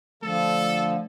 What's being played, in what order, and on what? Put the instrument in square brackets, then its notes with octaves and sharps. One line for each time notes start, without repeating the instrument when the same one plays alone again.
[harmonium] D3 F3 [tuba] A3 [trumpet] A4